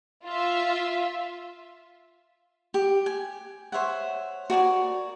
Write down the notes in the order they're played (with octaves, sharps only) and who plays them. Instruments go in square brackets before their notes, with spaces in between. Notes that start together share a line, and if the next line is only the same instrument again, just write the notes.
[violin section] F4 E5
[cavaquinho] G4
G#5
C5 C#5 E5 F#5
F#4 A#4 D5 G#5